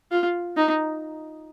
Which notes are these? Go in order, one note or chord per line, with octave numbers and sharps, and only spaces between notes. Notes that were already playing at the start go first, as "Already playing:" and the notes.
F4
D#4